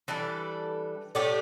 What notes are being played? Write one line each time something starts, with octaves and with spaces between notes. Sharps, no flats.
E3 G3 D4 A4
A2 A3 D4 G4